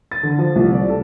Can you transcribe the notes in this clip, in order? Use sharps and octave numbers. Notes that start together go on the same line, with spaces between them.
A6
D3
F3
C2
D5
A4